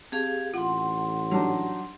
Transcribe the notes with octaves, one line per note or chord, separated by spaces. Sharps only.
C4 G4 G#4 F5
A1 F4 F#5 C6
F#3 D4 D#4 G4